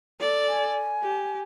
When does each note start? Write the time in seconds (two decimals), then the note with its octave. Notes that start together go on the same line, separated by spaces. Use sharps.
0.20 A4 D5
0.48 G#5
1.02 G4